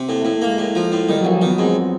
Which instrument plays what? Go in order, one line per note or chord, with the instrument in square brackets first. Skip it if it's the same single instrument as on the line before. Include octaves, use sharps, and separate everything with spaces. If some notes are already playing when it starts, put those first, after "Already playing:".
Already playing: [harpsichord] C3
[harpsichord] A2 [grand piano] A#3
[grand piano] A3
[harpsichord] A2
[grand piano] A3
[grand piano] G#3 [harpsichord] A#3
[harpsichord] A2
F3
A2
[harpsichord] D#3 [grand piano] G3
[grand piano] F#3
[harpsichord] A#1
[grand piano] F3
[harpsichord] D#3 [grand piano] B3
[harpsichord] G#2 [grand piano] C4